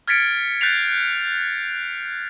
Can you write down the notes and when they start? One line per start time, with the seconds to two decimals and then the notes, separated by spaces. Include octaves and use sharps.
0.08 F6 G#6 A6 B6 C#7 D7
0.61 F#6 G6 A6 B6 C7 F7